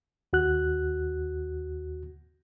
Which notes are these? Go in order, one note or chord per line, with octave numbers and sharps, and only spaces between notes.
D#2 F#4 F#6